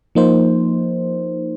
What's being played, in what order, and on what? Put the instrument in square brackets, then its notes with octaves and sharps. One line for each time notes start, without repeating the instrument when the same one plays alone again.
[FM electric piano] F3 A#3 D#4 C5